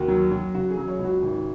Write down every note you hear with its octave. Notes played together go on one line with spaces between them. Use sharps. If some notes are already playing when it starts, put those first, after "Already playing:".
Already playing: D#2 F#4
F#3
F#3
C#3 F#4
G#4
F#3
C#5
C#2
F#4
G#1